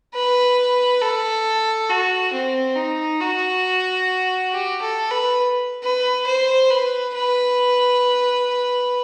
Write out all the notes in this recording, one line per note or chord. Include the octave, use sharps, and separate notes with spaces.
B4
A4
F#4
C4
D#4
F#4
G4
A4
B4
B4
C5
B4
B4